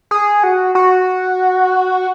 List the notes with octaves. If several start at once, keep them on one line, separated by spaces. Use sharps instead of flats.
G#4
F#4
F#4